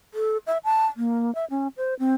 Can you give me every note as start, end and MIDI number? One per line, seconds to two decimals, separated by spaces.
0.14 0.38 69
0.47 0.58 76
0.64 0.86 81
0.97 1.34 58
1.35 1.45 76
1.50 1.68 61
1.77 1.94 72
1.99 2.14 60